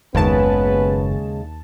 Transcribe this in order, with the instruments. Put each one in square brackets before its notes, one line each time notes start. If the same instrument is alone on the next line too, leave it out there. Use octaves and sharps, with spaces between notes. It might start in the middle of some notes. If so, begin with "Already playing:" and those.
[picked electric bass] F#1 [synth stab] D#2 A5 [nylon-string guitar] C#3 G#3 [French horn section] B3 C#4 B4